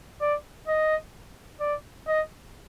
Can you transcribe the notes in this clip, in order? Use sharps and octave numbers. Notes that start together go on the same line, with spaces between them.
D5
D#5
D5
D#5